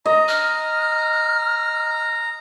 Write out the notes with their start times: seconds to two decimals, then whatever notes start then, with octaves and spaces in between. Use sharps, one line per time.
0.06 D#5 A#5
0.28 F6